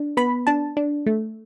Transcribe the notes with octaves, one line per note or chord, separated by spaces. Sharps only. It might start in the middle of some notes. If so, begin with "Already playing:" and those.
Already playing: D4
B3 B5
D4 A5
D4
A3